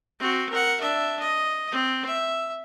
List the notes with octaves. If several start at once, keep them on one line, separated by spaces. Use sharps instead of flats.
C4 F#4
A#4 F#5
D4 E5
D#5
C4
E5